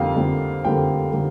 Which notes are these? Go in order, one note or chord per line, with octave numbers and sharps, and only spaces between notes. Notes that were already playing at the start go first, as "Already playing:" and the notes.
Already playing: F2 D3 G3 A#3 F5 G5
F2 D3 G3 A#3
F2 D3 G3 A#3 G5
D3 G3 A#3